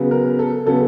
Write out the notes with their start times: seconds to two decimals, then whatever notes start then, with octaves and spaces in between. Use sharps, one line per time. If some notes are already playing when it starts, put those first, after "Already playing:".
Already playing: C#3 F#3 B3
0.11 A#4
0.39 A4
0.66 C#3 F#3 B3 A4